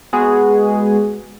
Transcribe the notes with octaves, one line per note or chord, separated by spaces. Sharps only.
G#3 B3 F#4 G#4